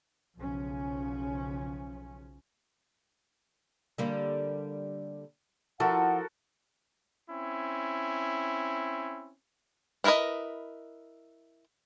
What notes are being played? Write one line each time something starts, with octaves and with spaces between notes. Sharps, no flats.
B1 C#3 F3 C#4
D3 G3 A#3
F3 E4 F#4 A4 A#4 F#5
C4 C#4 E4
D4 E4 A#4 B4 D#5